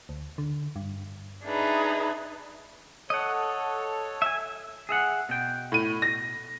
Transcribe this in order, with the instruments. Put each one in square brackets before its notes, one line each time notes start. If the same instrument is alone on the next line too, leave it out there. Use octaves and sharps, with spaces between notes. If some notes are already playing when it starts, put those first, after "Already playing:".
[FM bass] D2
D3
G2
[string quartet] D4 D#4 G#4 B4 E5 A#5
[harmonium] A4 C#5 [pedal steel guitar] D#5 F#5
[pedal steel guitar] E5 G#5
[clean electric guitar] G#4 E5 F#5
B2 G5
[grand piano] A2 D#7
A#6